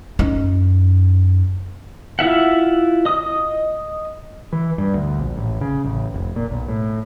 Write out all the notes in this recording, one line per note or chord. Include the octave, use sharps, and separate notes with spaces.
F#2 D#4
E4 F4 E5 F#5
D#5 D#6
E3
G2
D2
A#1
A1
C#3
A1
F1
A#2
B1
A2